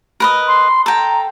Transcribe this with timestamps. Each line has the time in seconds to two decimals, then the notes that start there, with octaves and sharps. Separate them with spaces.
0.20 A#4 B4 D#5
0.47 C6
0.86 A4 G5 A#5